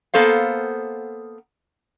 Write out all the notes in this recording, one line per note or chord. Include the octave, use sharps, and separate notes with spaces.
A#3 B3 A4 C5 F5